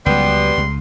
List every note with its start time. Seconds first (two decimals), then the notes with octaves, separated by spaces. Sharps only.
0.06 C#2 F#3 G3 B3 C6
0.58 C#2